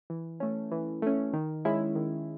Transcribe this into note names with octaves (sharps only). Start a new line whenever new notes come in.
E3
A3 C#4
E3
A3 C#4
D#3
G#3 C#4 E4
D#3